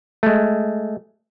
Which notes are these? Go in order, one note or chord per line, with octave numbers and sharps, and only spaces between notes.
G#3 A3